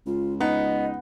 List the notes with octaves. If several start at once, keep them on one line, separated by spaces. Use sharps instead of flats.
C#2 F4
B3 D#4 D#5